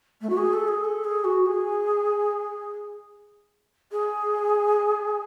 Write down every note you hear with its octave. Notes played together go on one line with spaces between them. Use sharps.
A3
F#4
G#4
A4
G#4
A4
G#4
F#4
G#4
G#4